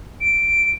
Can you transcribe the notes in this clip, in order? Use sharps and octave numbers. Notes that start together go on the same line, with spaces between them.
D7